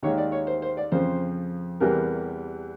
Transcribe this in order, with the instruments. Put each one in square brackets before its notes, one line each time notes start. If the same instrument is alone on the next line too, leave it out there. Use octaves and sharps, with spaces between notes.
[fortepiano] D#2 D#3 G#3 C#5
D5
C#5
C5
C5
D5
F2 C#3 F3 C5
E2 C3 E3 G3 A#4